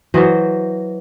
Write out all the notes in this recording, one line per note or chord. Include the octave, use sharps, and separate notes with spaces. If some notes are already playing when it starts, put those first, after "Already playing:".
E3 F#3 C5 D#5